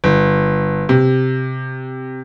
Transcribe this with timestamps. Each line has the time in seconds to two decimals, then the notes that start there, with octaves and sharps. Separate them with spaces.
0.04 G1
0.89 C3